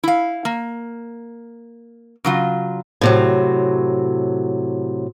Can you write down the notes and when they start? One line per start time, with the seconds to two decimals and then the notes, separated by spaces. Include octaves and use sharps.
0.03 E4 F5
0.45 A#3
2.24 C#3 F#3 F4
3.01 A2 C3 F#3